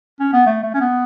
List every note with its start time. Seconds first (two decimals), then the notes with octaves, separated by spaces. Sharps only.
0.20 C#4
0.33 B3
0.46 A3
0.63 A3
0.74 C#4
0.81 B3